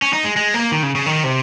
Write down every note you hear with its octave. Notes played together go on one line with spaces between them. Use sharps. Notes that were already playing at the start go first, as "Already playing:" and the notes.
C#4
D#4
G#3
G#3
A#3
D#3
C#3
C#3
D#3
C3